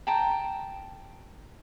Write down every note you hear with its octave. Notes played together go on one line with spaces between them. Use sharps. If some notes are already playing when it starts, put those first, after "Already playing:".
G5 A5 A#5